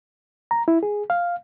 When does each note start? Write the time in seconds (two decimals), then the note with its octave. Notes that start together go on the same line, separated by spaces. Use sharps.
0.51 A#5
0.68 E4
0.83 G#4
1.10 F5